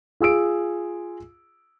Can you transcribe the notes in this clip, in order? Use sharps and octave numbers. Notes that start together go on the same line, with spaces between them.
F4 G#4 E6 D7